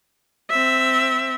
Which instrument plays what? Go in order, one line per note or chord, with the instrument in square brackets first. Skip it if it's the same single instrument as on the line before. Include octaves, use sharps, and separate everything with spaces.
[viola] C4 E5